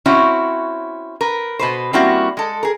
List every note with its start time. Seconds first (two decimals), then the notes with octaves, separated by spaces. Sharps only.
0.06 C4 C#4 E4 F#4 C#5
1.21 A#4 B4
1.59 B2 B4 C5
1.93 G3 A#3 C4 C#4 E4 F#4
2.37 G#3 A4
2.63 G#4 A#4